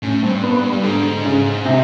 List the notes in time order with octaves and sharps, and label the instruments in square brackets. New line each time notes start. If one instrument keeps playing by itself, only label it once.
[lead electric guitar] A2 [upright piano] C#4
[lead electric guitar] G2 [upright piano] C4
[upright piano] B3
B3
G3
[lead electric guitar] G#2 [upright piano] D3
[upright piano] C#3
C3